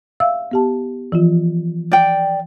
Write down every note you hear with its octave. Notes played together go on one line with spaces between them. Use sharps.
E5 F5 E6
B3 G4 A5
E3 F3 F4
D5 G5